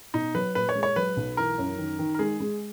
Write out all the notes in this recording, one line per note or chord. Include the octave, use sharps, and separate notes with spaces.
B2 D#4
F#3 B4
A#2 B4
C#5
G#3
C#5
F#3 B4
B1
E3 A#4
F#2
D#3
D#3
A#4
G#3 G#4
G#3